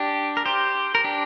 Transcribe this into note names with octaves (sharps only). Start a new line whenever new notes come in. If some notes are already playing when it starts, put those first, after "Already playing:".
Already playing: D4 G4
A#4
G4 C5
A#4
D4 G4